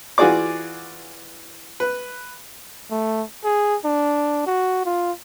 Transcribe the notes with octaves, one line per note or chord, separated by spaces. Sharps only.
E3 F4 F#4 G#4 D5 D6
B4
A3
G#4
D4
F#4
F4